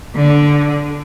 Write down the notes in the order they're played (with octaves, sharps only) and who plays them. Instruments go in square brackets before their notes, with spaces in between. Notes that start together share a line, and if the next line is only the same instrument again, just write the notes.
[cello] D3